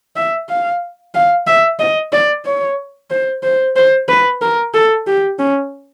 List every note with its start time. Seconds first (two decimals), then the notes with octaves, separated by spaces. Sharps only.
0.16 E5
0.49 F5
1.15 F5
1.47 E5
1.79 D#5
2.13 D5
2.45 C#5
3.11 C5
3.43 C5
3.76 C5
4.09 B4
4.42 A#4
4.74 A4
5.07 G4
5.39 C#4